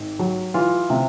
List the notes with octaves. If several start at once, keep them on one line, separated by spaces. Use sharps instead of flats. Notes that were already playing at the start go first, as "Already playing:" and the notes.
Already playing: G#1
F#3
E3 F4
C3